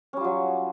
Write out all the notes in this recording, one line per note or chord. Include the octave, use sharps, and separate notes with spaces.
F#3 G3 C#4 F4